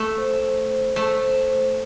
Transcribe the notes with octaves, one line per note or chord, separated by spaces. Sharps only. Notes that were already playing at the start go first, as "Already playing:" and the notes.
Already playing: A3
C5
C5
C5
A3 C5
C5
C5